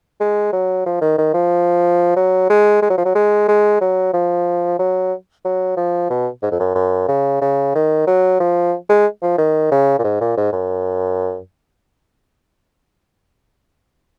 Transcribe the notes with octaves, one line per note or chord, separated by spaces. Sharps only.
G#3
F#3
F3
D#3
D#3
F3
F#3
G#3
G#3
F#3
F3
F#3
G#3
G#3
F#3
F3
F#3
F#3
F3
B2
G#2
F2
F#2
F#2
C#3
C#3
D#3
F#3
F3
G#3
F3
D#3
C#3
A#2
G#2
A#2
G#2
F#2